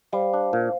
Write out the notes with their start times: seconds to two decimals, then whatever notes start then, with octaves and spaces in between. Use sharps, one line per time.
0.13 G3 C5 F5
0.34 D4
0.53 A#2